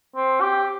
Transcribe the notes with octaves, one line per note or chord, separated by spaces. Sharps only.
C4
G4